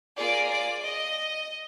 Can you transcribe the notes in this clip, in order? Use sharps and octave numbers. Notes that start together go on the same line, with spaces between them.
A#3 F4 G#4 D5
D5
D#5